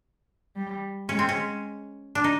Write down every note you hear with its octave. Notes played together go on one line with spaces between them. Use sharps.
G3
G#3 C#4
C4
C#4
D4
D#4